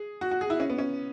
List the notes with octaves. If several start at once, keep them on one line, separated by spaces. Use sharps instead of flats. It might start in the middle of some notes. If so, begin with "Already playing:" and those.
Already playing: G#4
F#4
F#4
G#4
E4
C#4
B3
C#4